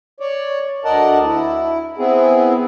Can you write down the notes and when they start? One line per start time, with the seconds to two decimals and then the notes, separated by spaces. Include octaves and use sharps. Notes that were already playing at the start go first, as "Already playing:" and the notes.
0.20 C#5 D5
0.85 D2 A#4 D5 D#5 F#5 A5
1.25 E4
1.98 B3 C4 E4 G#4